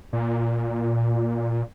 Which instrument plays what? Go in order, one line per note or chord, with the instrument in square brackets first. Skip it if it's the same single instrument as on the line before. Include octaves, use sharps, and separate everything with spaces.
[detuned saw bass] A#2